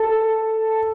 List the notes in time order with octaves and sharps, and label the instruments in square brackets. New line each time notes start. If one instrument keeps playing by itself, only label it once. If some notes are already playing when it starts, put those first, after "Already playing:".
Already playing: [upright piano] A4